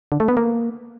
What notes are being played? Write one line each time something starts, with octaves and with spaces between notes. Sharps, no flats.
D3
A3
B3
A#3